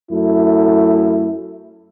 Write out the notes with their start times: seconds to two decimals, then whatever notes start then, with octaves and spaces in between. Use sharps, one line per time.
0.11 F#2 A3 E4